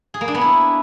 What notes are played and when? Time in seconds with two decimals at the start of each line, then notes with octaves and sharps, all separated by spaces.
0.14 G#4
0.21 A#3
0.28 D4
0.35 B3
0.41 E4